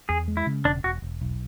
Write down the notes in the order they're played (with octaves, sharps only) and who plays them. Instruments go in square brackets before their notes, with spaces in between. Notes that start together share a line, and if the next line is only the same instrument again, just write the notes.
[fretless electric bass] E2 [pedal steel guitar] G#4
[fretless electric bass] G#3
[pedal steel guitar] E4
[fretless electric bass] C#3
[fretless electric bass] E1 [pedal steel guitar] D4
[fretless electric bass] E1 [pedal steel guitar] F#4
[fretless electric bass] E1
B1